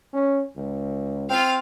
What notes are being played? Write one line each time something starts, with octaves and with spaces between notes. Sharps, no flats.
C#4
C#2
C4 F4 F5